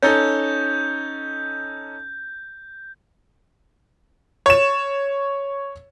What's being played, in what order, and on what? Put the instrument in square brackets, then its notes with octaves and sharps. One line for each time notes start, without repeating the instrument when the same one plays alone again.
[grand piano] C#4 D#4 A4 [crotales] G6
[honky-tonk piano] C#5 E7